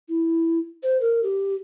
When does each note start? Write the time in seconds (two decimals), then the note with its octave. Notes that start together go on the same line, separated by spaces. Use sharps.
0.09 E4
0.83 C5
1.01 A#4
1.23 G4